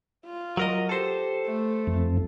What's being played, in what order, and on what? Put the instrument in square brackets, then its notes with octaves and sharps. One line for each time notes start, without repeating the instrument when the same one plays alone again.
[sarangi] F4
[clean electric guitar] F#3 A#4 D#5
[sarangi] G4 [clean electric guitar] A4 C5
[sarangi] A3
[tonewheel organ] F2